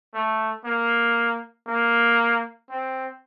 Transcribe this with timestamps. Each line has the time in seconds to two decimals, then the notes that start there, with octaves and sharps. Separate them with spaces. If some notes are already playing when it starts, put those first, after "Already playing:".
0.14 A3
0.65 A#3
1.68 A#3
2.70 C4